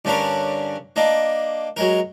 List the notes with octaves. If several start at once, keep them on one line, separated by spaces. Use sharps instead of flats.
G2 D3 C#4 D4 A#4
A#3 D4 D#5
F#3 G#3 A#4